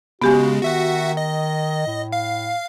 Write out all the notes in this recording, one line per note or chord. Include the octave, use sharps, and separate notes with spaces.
C#3 G#3 B3 F#4 G4 G#5
D#3 F#4 E5 F#5
D#5
A2
F5